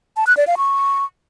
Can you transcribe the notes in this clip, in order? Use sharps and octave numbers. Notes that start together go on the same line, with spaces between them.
A5
F#6
D5
F5
C#6